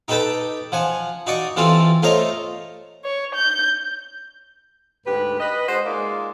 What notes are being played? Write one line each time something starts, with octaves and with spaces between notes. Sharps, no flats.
D#4 G4 A4 B4 G5 A5
F3 F#5 G#5
D#4 F#4 D5 C#6 D#6
E3 G3 C4 F4 A4
A3 F4 C5 C#5 D#5 A#5
C#5
G6
D2 G#2 G4 B4
B4 D#5
G#3 F#4 C5 D#5
G#3 A#3 D#4 F4 G#4 D5